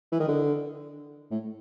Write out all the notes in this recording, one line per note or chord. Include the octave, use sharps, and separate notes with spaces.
E3
D#3
D3
A2